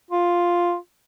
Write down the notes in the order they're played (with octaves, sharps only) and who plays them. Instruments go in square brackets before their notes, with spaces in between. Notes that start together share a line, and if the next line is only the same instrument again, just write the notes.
[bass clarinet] F4